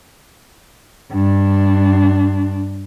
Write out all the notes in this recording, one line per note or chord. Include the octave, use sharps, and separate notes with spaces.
G2 D4